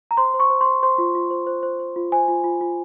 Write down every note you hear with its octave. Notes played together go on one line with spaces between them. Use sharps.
A#5
C5 C6
C5
C#6
C5
C6
C5
C5 C6
F4
F4
C5
C5
C5
C5
F4
C5 G#5
F4
F4
F4